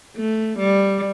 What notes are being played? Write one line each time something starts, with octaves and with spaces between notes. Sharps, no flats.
A3
G3